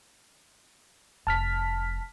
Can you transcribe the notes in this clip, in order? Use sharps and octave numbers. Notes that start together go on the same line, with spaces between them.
F1 A5 F6 B6